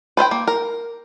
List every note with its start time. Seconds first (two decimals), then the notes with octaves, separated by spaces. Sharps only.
0.17 B4 C5 E5 G5
0.31 A#3
0.47 A#4